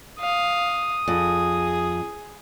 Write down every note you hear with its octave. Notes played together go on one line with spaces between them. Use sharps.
F5 D#6
F2 G#4